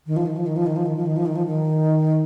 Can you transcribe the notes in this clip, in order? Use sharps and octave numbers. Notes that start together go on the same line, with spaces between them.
D#3
F3
D#3
F3
D#3
F3
D#3
F3
D#3
F3
D#3
F3
D#3
F3
D#3